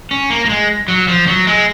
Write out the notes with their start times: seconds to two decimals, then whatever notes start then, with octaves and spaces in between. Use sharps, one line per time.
0.11 C#4
0.30 A#3
0.45 A#3
0.50 G#3
0.88 F#3
1.08 F3
1.27 F#3
1.47 G#3